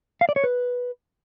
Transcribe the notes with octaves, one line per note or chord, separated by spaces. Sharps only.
F5
D5
C#5
B4